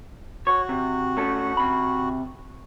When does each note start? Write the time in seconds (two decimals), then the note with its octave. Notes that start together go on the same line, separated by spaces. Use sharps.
0.47 F#4 C#5
0.69 C3
1.17 A3 C#4 A4
1.57 C3 B5